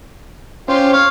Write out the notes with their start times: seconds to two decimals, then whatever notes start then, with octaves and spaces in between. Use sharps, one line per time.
0.68 C#4 F4 G4 C5
0.93 C#5 F5